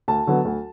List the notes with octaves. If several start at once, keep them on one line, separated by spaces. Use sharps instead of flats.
D2 A5
D3 F#3 B3
D2